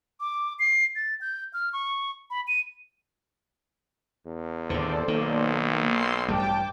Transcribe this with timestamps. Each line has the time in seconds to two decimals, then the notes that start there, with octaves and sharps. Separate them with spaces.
0.20 D6
0.59 C7
0.95 A6
1.21 G6
1.53 F6
1.73 C#6
2.30 B5
2.48 D#7
4.26 E2
4.70 D#2 A2 D3 A4 C5 D5
5.08 B1 D#3 A#3
5.91 C6 E6 C7
6.28 A1 G2 G3 A3 G5 A5 D6